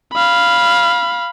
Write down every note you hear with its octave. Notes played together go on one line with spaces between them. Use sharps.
F5 B5